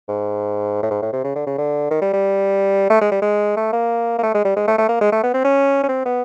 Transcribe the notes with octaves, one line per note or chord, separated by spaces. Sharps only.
G#2
A2
G#2
A2
C3
C#3
D3
C#3
D3
D#3
G3
G3
A3
G#3
G3
G#3
A3
A#3
A#3
A3
G#3
G3
G#3
A3
A3
A#3
G#3
A3
B3
C4
C#4
C#4
C4
B3